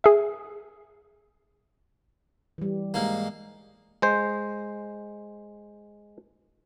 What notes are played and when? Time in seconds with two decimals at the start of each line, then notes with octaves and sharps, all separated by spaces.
0.04 G#4 E5
2.58 E3 G3
2.94 G#2 A#3
4.02 G#3 C5